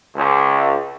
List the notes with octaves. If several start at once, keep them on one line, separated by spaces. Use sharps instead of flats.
C#2